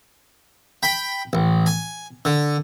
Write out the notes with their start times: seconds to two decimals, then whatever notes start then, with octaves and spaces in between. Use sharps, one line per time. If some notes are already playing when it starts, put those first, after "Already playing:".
0.83 G5 B5
1.33 A1
1.66 G#5
2.25 D3